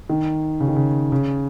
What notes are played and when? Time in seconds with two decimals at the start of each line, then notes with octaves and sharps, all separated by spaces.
0.09 D#3
0.60 C#3
0.68 D#3
0.76 C#3
1.12 C#3